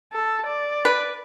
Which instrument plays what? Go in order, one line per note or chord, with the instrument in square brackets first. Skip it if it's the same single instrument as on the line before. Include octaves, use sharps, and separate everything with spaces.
[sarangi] A4
D5
[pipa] B4